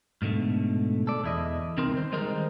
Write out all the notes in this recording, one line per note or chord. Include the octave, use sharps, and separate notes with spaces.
G#2 B2 D3 A3
A4 D5
E2 E4 D#5
C2 C4 D#4 A#4 C6
D#3 C5
D#3 G3 G#3 D#4 A#4 C5